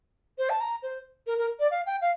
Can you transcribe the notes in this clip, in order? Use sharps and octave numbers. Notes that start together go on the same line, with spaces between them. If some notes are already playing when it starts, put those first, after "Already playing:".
C5
A5
A#5
C5
A#4
A#4
D5
F5
G5
F5